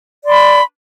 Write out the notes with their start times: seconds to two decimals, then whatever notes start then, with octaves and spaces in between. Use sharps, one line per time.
0.23 D5
0.26 C6
0.28 B5